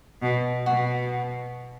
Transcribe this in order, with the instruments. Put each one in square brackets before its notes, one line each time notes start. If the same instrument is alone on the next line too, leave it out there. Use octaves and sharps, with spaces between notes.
[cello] B2
[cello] B2 [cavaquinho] F#4